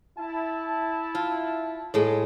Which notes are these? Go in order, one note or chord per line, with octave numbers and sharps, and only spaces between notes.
E4 A5
F4
A2 G#3